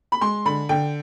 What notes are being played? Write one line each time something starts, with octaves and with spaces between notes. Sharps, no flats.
B5
G#3 C6
D3 B5
D3 G5